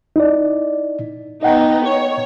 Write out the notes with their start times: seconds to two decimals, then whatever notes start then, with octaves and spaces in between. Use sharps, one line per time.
0.16 D#4 E4 D5
1.43 B3 D#4 D#5 F#5 G5
1.85 C#5